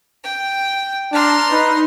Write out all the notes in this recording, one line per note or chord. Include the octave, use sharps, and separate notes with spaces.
G5
D4 A5 A#5 C6 F6
D#4 B4